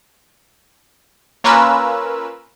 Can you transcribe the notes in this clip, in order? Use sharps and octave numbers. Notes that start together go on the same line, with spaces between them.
A#3 C#4 F4 A#4 B4 E6